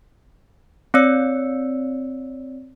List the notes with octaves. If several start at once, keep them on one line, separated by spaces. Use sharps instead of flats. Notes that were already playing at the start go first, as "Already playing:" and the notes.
C4 C#5 D5 E6 C#7